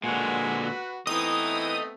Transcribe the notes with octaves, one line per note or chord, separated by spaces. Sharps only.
A#2 D3 G#3 F#4 B4 F#5
E3 A3 B3 C4 D#5 A#5 D#6